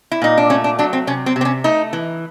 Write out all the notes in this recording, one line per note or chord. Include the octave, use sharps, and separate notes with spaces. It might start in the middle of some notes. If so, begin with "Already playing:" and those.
E4
A#2 D#4
D4
A3 C#4
D4
F#3 D4
C4
C3 C#4
C4
C3
C4
C#4
A3 D#4
E3